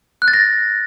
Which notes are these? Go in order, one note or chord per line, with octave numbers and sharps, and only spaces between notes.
F#6
A6
A#6